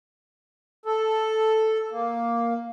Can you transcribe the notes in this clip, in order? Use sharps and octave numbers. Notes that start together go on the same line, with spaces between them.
A4
A#3